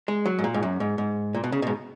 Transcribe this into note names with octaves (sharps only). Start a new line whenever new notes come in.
G#3
F#3
G#2
A#2
G#2
F#2
G#2
G#2
A#2
B2
C#3
G#2 B2